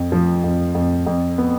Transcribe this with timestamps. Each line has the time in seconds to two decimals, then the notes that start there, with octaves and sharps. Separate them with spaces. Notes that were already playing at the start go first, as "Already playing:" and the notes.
Already playing: F2
0.12 F3
0.44 F2
0.75 F2
1.06 F2
1.38 B3